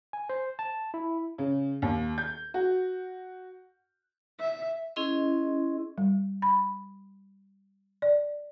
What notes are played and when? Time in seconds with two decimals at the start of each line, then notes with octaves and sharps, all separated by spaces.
0.13 G#5
0.29 C5
0.59 A5
0.94 E4
1.38 C#3
1.82 D#2
2.18 G6
2.54 F#4
4.40 E5
4.96 C#4 E4 G#4 D#5 C6
5.98 G3
6.42 B5
8.02 D5